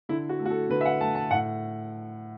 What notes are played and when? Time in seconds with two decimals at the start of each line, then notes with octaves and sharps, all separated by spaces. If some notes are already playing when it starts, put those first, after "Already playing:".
0.09 D3 E4
0.29 F#4
0.39 A3
0.46 F#4
0.50 A4
0.70 D3 B4
0.81 E5
0.85 F#5
1.01 A3 A5
1.15 A5
1.31 A2 F#5